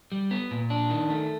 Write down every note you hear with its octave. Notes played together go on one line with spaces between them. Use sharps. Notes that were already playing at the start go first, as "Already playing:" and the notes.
G3
B3
A#2
D4
D#3
A3